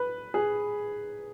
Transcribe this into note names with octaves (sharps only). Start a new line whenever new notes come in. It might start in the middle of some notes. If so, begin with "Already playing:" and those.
Already playing: B4
G#4